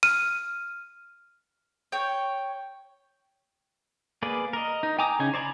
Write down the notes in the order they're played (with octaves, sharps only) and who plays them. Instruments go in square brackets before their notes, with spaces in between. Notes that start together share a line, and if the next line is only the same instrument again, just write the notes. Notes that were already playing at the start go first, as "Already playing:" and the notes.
[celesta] F6 [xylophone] D#7
[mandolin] C#5 G5
[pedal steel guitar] A#3 G#4 B4 D5
A#4 D#5
D#4
G5 G#5 A#5 D6 D#6
C#3 C#4 D#4 G#5
C5 D5 G#5 A#5 B5